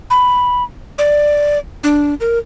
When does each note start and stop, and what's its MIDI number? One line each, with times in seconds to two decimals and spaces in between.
0.10 0.63 83
0.98 1.58 74
1.83 2.14 62
2.20 2.38 70